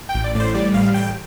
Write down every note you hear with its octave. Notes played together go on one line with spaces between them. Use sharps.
G5
A1
D5
A2 D5
C5
G3 D5
A1 F5
A1 G5